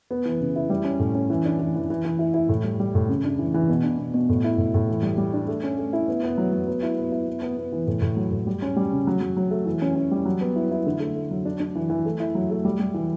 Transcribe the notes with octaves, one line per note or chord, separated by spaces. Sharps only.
B3
E3
C#3
E4
G3
C#4
A2
C#4
E3
D4
E3
E3
E3
E3
E4
E4
A2
G3
G3
A2
C#3
D4
E3
E3
B2
D4
B2
B2
A2
E4
A2
A2
E3
G3
G3
D4
A3
C#4
A3
E4
B3
B3
F#3
F#3
B3
E4
B3
E4
B3
B3
B3
E3
A2
A2
F#3
A2
G3
C#4
G3
C#3
F#3
F#3
F#3
A3
E3
C#4
C#4
G3
F#3
B3
E4
E4
D3
A3
A3
F#3
D4
D4
E3
E3
A3
E4
F#3
A3
G3
G3
E3